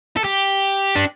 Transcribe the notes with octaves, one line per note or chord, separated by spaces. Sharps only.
A4
G4
D4